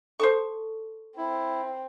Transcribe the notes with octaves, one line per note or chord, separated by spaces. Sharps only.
A4 C5 A5 C#6
C4 E4